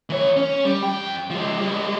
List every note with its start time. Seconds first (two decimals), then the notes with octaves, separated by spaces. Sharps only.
0.10 E3 C#5
0.37 C#4
0.65 G3
0.83 F2 G5
1.30 F3 G#3
1.61 G3 G#3